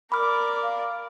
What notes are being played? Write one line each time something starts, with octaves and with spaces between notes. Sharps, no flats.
A#4 D5 B5 D6 F6
F5